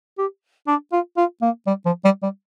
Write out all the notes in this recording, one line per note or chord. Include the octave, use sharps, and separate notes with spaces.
G4
D4
F4
F4
A#3
G3
F3
G3
G3